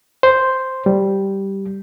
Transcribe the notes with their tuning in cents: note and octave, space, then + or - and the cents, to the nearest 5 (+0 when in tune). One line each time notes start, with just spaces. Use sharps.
C5 +0
G3 -5